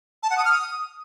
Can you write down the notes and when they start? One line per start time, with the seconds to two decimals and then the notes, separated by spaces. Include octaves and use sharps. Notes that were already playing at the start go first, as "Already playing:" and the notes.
0.23 A5
0.30 F#5
0.38 D#6
0.45 F6
0.52 D#6